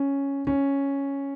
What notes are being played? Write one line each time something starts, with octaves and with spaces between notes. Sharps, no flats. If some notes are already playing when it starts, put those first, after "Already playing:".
Already playing: C#4
C#4